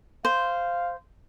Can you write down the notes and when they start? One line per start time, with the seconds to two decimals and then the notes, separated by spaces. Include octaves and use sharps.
0.25 C5 F5